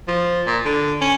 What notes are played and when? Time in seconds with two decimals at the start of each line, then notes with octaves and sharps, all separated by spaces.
0.08 F3
0.47 A#2
0.65 D3
1.01 C#4